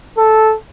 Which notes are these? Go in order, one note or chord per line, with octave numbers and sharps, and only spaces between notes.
A4